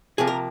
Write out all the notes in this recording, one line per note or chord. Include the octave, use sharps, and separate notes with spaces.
C3 F3 A#3 G#4
A#4